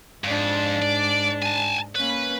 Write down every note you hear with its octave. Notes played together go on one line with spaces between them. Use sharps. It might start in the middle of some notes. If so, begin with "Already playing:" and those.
F2 G#2 D4
D5
G#5 A5
A#3 C#4 B4